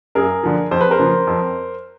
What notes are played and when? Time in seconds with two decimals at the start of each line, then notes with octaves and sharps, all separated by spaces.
0.15 F#2 G#4 A#4
0.43 D3 F3
0.71 F2 C5
0.81 B4
0.91 A#4 C5
0.99 C#3 F3
1.27 F2